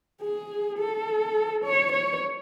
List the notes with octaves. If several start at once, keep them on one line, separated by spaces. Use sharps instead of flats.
G#4
A4
C#5
C#5